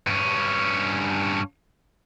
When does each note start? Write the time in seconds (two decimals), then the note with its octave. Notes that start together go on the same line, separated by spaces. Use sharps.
0.07 G2 C#4